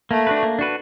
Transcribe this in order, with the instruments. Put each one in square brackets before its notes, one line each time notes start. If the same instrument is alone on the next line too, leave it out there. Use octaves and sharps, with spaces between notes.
[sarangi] A3 [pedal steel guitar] A#3
[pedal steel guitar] D4 F#4 B4
A#3
D4 F#4 B4